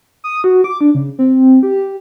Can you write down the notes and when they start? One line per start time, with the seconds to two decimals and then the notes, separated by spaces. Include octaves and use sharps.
0.24 D#6
0.44 F#4
0.64 D6
0.81 D4
0.95 C#3
1.19 C4
1.63 G4